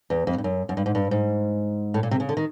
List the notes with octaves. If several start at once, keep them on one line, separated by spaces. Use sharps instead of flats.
E2
F2
G2
F#2
F#2
G2
G#2
G2
G#2
A2
A#2
C3
C#3
D3
D#3